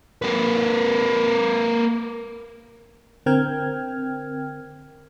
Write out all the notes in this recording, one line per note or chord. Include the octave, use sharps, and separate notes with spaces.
A#3 B4
D3 C4 A#4 G5 F6 G#6